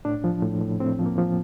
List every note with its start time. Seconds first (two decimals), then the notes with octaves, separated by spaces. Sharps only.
0.05 A2 D4
0.24 F3
0.42 A2
0.61 A2
0.80 A2 C4
0.99 F3
1.06 A#3
1.18 F3